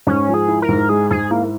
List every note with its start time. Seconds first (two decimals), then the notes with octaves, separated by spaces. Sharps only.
0.07 G#2 C#4
0.28 F3
0.34 G#4
0.48 E4
0.62 A#4
0.69 G#2
0.89 G#3 G#4
1.11 G#2 G#4
1.30 A#3 E4